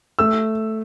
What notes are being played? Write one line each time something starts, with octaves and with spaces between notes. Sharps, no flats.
A3 E6